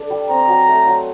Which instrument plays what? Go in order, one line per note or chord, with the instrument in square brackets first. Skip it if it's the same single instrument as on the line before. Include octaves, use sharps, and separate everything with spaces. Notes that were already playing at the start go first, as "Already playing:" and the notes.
Already playing: [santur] D4 A4
G3
[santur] C4 [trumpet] A#5
[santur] F#3
A3
F#3